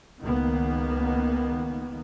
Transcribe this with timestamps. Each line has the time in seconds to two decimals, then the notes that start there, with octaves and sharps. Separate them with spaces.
0.22 C#2 D#3 A#3 B3